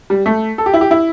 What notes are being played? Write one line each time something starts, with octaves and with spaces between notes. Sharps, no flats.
G3
A3
A4
G4
E4
G4
E4